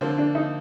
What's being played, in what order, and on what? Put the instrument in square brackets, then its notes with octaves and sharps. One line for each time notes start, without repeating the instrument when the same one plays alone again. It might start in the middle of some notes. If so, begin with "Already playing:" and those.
[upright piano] D3 F3 A#3 [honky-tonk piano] C4
[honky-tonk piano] D4
D#4